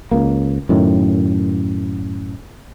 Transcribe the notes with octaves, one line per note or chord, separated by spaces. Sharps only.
C#2 A#3
F#2 A2 D#3